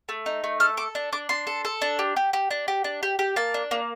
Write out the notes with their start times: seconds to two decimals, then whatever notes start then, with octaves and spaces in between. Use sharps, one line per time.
0.09 A3
0.26 D#4
0.44 A3
0.60 A4 F6
0.77 A4 D6
0.95 D4
1.13 D4 D6
1.29 D4 C6
1.47 A4
1.65 A4
1.82 D4
1.99 G4
2.16 G4
2.33 G4
2.50 D4
2.68 G4
2.84 D4
3.03 G4
3.19 G4
3.36 A#3 A5
3.54 D4
3.71 A#3